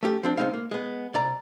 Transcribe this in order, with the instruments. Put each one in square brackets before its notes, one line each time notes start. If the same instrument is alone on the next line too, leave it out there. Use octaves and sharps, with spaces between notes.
[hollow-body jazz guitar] A3 C#4 G4
F3 C4 D4
C#2 B2 G#3 C4 D#4 F5
A#3
G#3 B3
C2 D5 A#5